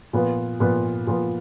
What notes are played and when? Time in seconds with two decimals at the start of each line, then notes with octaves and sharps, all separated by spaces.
0.13 A#2 F3 B3 F4 B4
0.60 A#2 F3 B3 F4 B4
1.07 A#2 F3 B3 F4 B4